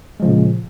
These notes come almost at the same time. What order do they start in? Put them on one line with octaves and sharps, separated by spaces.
G#3 F3 C#3 A#2